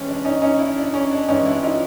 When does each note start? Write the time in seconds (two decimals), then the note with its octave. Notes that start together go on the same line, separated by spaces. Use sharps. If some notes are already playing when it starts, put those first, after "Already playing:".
Already playing: C3 E3 G#3 C4 C#4
0.08 D4
0.25 C#4 D#4
0.42 C#4 D#4
0.59 D4 E4
0.77 D4
0.94 C#4
1.11 D4
1.28 G2 E3 G#3 C4 C#4 D#4
1.45 D4 E4
1.63 D#4 F4